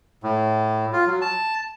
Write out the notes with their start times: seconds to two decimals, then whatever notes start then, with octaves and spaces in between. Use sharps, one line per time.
0.23 A2
0.93 F4
1.07 F#3
1.22 A5